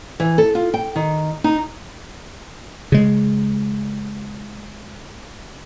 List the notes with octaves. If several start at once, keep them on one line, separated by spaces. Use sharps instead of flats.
E3
A4
F4
G5
D#3
D#4
C#3 G#3